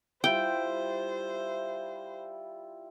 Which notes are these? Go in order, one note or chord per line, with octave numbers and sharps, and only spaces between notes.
G3 E4 F4 C5 G5